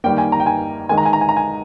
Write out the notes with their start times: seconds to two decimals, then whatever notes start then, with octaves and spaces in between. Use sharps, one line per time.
0.04 D#3 G3 A#3 G5
0.18 G#5
0.32 A#5
0.40 G5
0.46 G#5
0.89 D#3 G#3 G#5
0.98 A#5
1.05 G#5
1.13 A#5
1.21 G#5
1.29 A#5
1.36 G#5